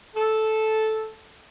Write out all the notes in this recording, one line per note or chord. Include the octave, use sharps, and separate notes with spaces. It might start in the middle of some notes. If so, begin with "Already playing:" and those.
A4